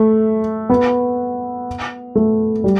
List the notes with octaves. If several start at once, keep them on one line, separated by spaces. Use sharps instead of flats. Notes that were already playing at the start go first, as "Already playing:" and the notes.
Already playing: A3
B3
A3
G3